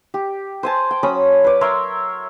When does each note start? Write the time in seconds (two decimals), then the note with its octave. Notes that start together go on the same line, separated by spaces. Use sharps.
0.14 G4
0.63 C5 G#5 A5
0.91 G5
1.03 F#3 C#4 B5 D#6
1.44 B4 D5
1.61 A#4 C#5 E5 C6